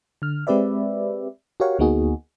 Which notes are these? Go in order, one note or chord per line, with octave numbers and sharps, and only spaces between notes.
D3 F6
G#3 C4 G4 B4 D5 E5
F#4 G4 A#4 C#5 F5 F#5
D2 A#3 B3 D#4 F#4 G#4